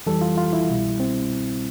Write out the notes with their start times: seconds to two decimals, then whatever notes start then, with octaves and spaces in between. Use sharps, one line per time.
0.06 F2 E3 G3 A4
0.21 F4
0.38 F4
0.53 E4
0.68 C2 B2 G3
1.00 C4